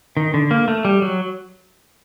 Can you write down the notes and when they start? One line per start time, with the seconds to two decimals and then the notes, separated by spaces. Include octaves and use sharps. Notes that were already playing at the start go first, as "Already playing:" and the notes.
0.17 D#3
0.34 D3
0.51 A#3
0.68 A3
0.85 G3
1.02 F#3